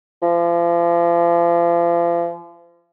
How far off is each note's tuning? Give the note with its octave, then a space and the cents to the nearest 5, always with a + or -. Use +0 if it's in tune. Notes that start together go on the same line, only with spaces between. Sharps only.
F3 -35